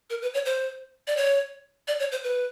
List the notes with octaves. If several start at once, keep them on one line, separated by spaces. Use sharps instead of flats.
A#4
B4
C#5
C5
D5
C#5
D5
C#5
C5
B4